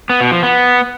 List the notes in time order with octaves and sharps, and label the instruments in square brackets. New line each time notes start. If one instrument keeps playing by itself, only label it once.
[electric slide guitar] B3
B2
F3
B3